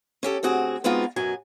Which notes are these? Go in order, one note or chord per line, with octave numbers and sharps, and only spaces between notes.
C#4 G4 A4
D2 C4 F#4 G#4
G#3 B3 C4 D#4 F4 F#4
F#2 B2 F#3 G#5